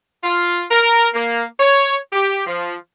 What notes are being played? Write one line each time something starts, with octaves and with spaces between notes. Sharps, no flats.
F4
A#4
A#3
C#5
G4
F3